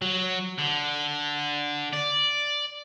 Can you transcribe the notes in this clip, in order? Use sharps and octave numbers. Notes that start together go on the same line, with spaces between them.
F#3
D3
D5